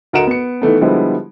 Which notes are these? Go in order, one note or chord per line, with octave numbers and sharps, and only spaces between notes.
D2 A#4 D#5 F#5 D7 E7
B3 C#7
D#3 E3 A3 B3
D3 F3 G3 G#3 B3 E4